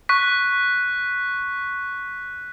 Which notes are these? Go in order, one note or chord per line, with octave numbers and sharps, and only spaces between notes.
C#6 F#6 B6